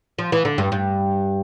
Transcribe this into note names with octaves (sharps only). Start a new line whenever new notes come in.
F3
E3
D3
G2
G2